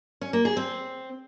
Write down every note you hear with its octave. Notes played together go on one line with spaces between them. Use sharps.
C#4
A#3
G#4
C4